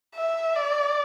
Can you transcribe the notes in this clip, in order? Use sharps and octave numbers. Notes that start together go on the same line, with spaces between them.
E5
D5